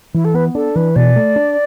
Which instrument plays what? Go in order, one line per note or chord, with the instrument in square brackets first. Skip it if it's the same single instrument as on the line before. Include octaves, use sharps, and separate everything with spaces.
[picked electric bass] E3 [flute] E4
[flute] A4
[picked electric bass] B3 [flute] B4
[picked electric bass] D4 [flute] A4
[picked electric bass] E3 [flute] B4
[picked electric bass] B2 [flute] D5
[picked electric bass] A3
D4